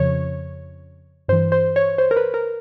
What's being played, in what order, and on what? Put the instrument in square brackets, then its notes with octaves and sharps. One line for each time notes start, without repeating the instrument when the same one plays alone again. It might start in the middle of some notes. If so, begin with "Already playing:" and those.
Already playing: [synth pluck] F2 C#3 F3 C#5
G2 E3 C5
C5
C#5
C5
A#4
B4
A#4